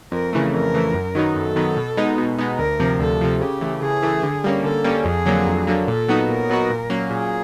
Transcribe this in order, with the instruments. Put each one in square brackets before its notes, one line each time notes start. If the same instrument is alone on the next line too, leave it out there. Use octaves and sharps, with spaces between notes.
[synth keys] F2 [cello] A#4
[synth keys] C#3 E3 A3
[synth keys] F2 [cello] A#4
[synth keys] C#3 E3 A3
F#2
D#3 F#3 B3 D#4
[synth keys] F#2 [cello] A4
[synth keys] D#3 F#3 B3 D#4
B2
G#3 B3 D#4
B2
G#3 B3 D#4
[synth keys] D2 [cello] A#4
[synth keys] C3 F3
[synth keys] D2 [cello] A4
[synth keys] C3 F3
[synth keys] C#3 [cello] G4
[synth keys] E3 A3
[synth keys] C#3 [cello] G#4
[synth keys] E3 A3
D3
G3 A#3 C#4
[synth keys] D3 [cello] A4
[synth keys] G3 A#3 C#4
[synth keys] F2 [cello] G#4
[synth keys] D3 F#3 A#3
F2
D3 F#3 A#3
[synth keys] A#2 [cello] A4
[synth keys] F#3 B3 D#4 F#4
[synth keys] A#2 [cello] A#4
[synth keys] F#3 B3 D#4 F#4
A#2
F#3 A#3 C#4
[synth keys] A#2 [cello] G#4